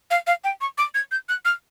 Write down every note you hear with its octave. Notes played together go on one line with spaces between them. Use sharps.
F5
F5
G5
C#6
D6
G#6
G6
F#6
F6